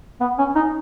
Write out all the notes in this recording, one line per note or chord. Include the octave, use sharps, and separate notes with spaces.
B3
C#4
D#4